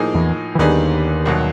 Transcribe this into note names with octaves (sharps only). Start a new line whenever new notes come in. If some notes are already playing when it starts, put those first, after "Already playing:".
Already playing: A2 F3 A#3 D#4 G#4
E2 E3
E3
D#2 D3 D#3 G3 B3 D#4 G#4
C2 B2 F#3